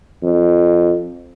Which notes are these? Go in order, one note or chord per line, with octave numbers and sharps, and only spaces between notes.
F2